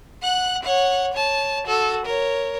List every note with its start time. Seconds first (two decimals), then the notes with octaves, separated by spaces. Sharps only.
0.22 F#5 F#6
0.63 C#5 F#5
1.13 C#5 A5
1.66 F#4 A4
2.05 A#4 C#5